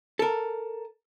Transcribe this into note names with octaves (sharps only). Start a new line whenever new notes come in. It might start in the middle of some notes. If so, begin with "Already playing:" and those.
A4 A#4